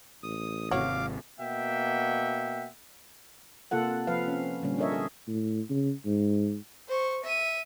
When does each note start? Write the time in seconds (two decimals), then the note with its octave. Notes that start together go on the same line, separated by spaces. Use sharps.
0.23 A1 D#6
0.71 G#1 C3 F#4 C#5 F5 D6
1.39 B2 A#3 E5 F#5 G5
3.71 C3 A#3 F4 A4 F#5
4.07 F3 C4 B4 F5
4.28 C#4
4.63 A#2 D3 G3 C#4
4.78 D4 G#4 A#4 C#5 D#5 E5
4.92 G#4
5.27 A2
5.70 C#3
6.06 G#2
6.88 C5 C#6
7.24 E5 D#7